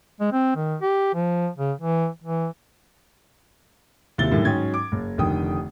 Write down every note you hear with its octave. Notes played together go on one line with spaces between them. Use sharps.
G#3
C4
D#3
G4
F3
C#3
E3
E3
F#1 D#2 C3 E4 A6 G7
F#2 A2 D3 D#3 G3 E4
G#2 F#3 C#4 G5 G#6
D6
F#1
F1 D3 D#3 G5 D#6